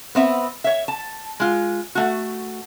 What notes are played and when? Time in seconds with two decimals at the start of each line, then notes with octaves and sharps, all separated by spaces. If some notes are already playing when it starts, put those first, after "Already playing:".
0.15 B3 C4 E5
0.64 C#5 E5
0.88 A5
1.40 G#3 F4
1.95 A3 F#4